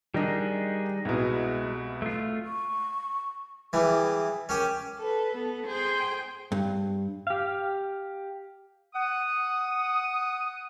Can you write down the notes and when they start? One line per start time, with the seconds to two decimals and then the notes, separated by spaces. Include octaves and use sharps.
0.14 D#3 G3 D4 D#4 G#4
1.05 C2 B2 G#3
2.02 A3 F4
2.45 C#6
3.73 E3 G3 G#4
4.49 C#4 G4 A#4
4.99 A4 B4
5.34 B3 A4
5.68 G#4 C5 G5
6.52 G2
7.27 G4 F5
8.94 F#5 D#6